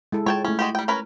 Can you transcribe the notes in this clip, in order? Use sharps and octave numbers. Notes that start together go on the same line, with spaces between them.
G#3 E4 A4
G#3 F4 A4 C#5 G5 A5
A3 C#4 E4
G#3 F#4 G4
G3 G5
C#4 A#4 B4